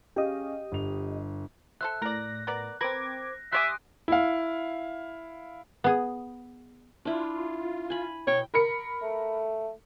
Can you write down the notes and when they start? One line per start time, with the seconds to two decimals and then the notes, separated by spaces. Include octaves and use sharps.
0.16 C#4 G4 G#4 D#5 F5
0.72 G1 F7
1.81 A4 C5 E5 F#6
2.02 A2 A#4 D5 A#6
2.47 B3 A#4 D5
2.81 C4 A#4 B4 D6 G#6 A#6
3.52 G3 C#5 E5 G#5 C6 D6 D#6 F#6
4.08 E4 F5
5.84 B3 G#4
7.05 D4 E4 F4
7.90 G#5 B5
8.27 B2 C#5 G5
8.54 A#4 B5 C#7
9.02 A3